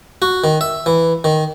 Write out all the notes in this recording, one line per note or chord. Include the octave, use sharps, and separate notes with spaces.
F#4
D#3
E5
E3
D#3